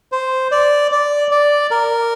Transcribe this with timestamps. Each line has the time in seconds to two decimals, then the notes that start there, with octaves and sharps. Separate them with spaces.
0.12 C5
0.52 D5
0.92 D5
1.31 D5
1.71 A#4